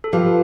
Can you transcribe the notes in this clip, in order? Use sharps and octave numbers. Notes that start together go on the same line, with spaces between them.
A4
F3 G4 B4